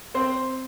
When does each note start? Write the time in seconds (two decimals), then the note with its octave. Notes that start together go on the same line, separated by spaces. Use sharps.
0.14 C4 C5